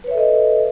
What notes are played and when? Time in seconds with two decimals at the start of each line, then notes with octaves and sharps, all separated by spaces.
0.04 B4
0.07 C#5
0.11 E5
0.14 A4
0.18 D#5